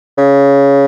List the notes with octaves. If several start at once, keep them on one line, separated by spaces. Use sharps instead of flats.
C#3